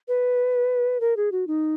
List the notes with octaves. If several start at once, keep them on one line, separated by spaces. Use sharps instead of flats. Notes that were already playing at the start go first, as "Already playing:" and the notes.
B4
A#4
G#4
F#4
D#4